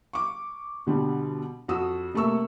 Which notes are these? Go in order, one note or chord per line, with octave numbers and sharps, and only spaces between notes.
C#6 D6
B2 D3 G3
F2 F#4 D#6 E6
C3 A3 A#3 C#6 E6